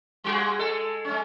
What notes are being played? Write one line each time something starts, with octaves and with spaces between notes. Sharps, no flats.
G3 F#4 G#4
G#3 A4
G#3 C#4